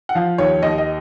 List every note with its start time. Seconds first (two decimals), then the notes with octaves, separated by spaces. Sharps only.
0.09 F#5
0.15 F3 F5
0.38 D#2 C#5
0.62 D#2 D#5
0.78 D#5